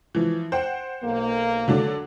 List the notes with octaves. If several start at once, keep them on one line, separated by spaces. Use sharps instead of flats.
E3 F3
C5 F#5 G5
B1 A#3
D3 F#3 D4